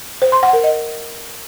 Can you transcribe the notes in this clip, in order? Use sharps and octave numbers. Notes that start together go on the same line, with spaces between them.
C5
C6
F#5
A#4
D#5